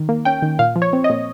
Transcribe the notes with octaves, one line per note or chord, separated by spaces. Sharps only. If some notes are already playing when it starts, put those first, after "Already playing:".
Already playing: D#3
A#3
C#4 G5
D#3
A#2 F5
F3
C#5
C4
D#5
A#2